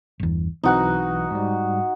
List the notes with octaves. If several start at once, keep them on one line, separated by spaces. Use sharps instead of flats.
G1 E2
B1 E3 C4 D#4 F#4 F#6
G#2 G3